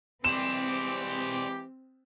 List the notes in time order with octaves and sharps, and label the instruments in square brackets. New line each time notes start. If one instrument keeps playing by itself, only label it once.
[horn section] E3 G#3 G4 [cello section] C4 [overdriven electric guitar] C5 D5 [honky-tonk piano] E7